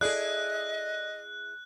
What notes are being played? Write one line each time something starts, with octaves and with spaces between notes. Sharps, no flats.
E4 G#4 A4 D5 D#5 F#6